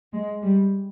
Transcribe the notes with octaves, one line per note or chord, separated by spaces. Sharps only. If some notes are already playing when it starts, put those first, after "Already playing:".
G#3
G3